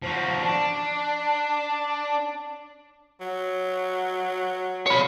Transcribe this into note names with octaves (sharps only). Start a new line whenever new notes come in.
F3 F#4
D4
F#3
C#5 B5